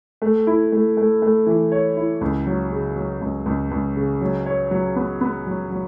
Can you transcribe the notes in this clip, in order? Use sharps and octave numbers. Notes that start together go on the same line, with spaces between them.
A3
E4
A3
A3
A3
E3
C#5
E4
C#2
F#3
C#3
F#3
C#2
C#2
C#2
C#3
F#3
C#5
F#3
B3
B3
F#3
F#3